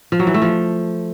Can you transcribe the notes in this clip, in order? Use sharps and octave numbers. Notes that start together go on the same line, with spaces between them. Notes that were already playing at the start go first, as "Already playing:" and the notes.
F3
F#3
E3
A3
F3